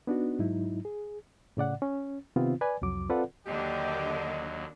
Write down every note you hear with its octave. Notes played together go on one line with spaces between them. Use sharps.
B3 D4 D#4 F#4
G#2 F#3 D#4 E4
G#4
A2 C#3 D5 F#5
C#4
C3 D#3 B3 C4 F4
B4 D5 G#5
C2 F2 F#3 D6
C4 F4 A4 B4 D5 F#5
D#2 D3 F#3 A#3 D4 G4 D#5